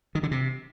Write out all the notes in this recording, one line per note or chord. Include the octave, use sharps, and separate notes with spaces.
D#3
D3
C3